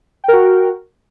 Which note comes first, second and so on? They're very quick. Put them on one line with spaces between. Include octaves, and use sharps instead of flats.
G5 A#4 F#4